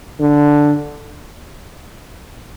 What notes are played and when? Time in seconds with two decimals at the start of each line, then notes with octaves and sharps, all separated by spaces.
0.20 D3